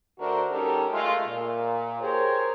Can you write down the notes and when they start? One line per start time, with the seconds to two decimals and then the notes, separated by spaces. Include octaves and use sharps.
0.19 D3 A3 D4 F#4 A#4 C5
0.51 G3 C#4 D#4 G4 A4 A#4
0.92 G#3 A3 F4
1.27 A#2
2.00 G4 G#4 A#4 C5 C#5